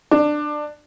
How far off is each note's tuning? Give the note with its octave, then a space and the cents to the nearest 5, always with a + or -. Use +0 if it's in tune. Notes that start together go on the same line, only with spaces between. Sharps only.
D4 +20